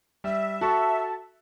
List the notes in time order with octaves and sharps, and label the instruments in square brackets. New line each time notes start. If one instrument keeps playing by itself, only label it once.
[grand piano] G3 [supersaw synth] E5
[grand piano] F#4 A4 C#6 [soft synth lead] A5